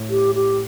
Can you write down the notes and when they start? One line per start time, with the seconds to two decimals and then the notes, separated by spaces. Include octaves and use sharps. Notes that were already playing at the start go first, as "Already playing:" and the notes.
Already playing: A2
0.10 G4
0.35 G4